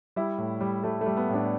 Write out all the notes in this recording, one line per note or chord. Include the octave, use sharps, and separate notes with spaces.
G3 E4
A2
G3
G3 A3
A3
G3
B3
A2 D4